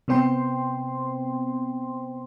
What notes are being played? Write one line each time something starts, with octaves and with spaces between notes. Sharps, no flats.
C3 B3 C4 C5 G5 C6